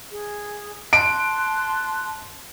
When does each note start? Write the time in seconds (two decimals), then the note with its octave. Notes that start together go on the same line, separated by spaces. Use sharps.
0.09 G#4
0.93 A5 C6 F#6 D7